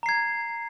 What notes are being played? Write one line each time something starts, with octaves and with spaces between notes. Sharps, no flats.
A#5 G#6 C7